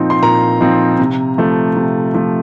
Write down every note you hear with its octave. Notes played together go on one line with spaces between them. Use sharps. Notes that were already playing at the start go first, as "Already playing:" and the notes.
Already playing: A#2 F3 C4 D#4
C6
A#2 A#5
F3 C4 D#4
C3
F3 A3
C3
F3 A3